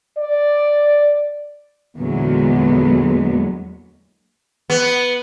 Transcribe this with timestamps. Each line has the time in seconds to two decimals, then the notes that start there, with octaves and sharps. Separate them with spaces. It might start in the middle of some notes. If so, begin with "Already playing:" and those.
0.18 D5
1.97 E2 A#2 D3 F#3 G#3 B3
4.70 B3